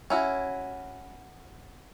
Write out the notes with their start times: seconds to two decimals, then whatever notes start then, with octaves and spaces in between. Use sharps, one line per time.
0.10 C#4 E4 F#4